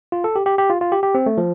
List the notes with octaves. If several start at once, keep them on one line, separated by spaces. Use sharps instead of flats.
F4
A4
G4
G4
G4
F4
F4
G4
G4
C4
A3
F3